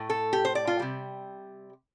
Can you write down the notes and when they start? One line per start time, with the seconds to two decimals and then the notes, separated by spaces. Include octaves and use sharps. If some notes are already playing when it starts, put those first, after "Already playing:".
Already playing: A2 A3
0.10 A4
0.33 G4
0.45 C5
0.55 D5
0.67 F4
0.79 C3 G3